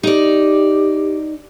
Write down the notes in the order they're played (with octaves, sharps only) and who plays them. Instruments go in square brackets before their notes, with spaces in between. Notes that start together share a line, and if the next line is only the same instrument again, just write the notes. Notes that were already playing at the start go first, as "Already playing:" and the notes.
[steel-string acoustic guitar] D#4 D5 [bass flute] G4